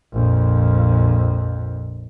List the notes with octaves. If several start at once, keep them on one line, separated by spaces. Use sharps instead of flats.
A#1 F2